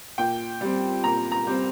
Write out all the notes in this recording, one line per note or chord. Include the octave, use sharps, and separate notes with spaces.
A#2 G5
G3 C4
A#2 A#5
A#5
G3 C4